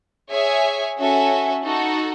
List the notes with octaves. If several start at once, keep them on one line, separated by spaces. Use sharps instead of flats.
G#4 C#5 E5 G#5
C#4 F#4 A4 E5 G#5
D#4 F#4 A4